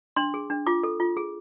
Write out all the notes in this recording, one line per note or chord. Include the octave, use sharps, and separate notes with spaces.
D4 C6
G#4
D4
F4 D6
A4
F4
G#4